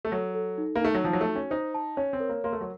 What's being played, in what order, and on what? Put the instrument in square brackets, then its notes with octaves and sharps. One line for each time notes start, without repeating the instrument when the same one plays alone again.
[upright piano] A3
[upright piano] F#3 [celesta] A4
[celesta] A4
D#4
[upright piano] A#3
[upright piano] A3 [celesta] D#4
[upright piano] F#3
[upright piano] F3 [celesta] A5
[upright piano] F#3
A3
[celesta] F#4
[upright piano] C#4
[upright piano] D#4 [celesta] C5
[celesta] A5
[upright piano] C#4 [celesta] C#5
[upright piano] C4
[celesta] A#4
[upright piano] A#3
[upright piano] A#3 [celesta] C6
[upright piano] A3
F#3